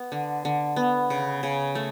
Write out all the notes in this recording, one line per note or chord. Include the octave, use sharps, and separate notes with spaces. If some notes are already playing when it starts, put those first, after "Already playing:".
Already playing: B3
D3
D3
B3
C#3
C#3
A3